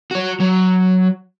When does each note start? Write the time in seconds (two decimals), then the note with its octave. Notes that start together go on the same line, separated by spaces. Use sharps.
0.11 F#4 C#5
0.40 F#3